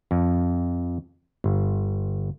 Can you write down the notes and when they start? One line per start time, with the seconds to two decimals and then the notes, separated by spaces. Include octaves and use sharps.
0.11 F2
1.44 G1